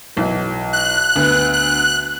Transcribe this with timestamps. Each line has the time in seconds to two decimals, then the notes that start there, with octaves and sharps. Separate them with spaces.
0.16 B1 E3
0.73 F#6
1.16 D2 B3
1.53 F#6